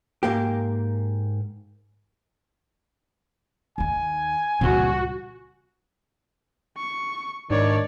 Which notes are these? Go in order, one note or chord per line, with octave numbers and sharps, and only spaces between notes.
G#2 A#3 G4
D#2 D#3 G#5
C#2 G2 A#2 E3 C4 F#4
C#6
G#2 D#3 D4 C#5 D5